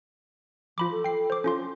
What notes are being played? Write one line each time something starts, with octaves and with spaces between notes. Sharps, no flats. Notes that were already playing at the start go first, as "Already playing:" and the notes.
F3 F4 B5 D6
A4
G5 C7
C5 D6
C#4 F4 C6